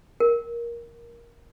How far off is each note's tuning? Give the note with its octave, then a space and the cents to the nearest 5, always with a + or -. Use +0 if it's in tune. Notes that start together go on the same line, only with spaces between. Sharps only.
A#4 +10